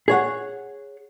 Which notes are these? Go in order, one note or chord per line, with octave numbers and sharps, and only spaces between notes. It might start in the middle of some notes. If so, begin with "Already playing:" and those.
G#4 C#5 F#5